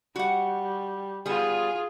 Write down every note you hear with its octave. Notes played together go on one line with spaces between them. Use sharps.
G3 F#4 F#5
G3 B3 F4 G#4